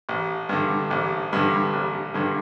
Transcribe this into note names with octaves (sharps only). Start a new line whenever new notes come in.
A1
G2 D3
A1
G2 D3
A1
G2 D3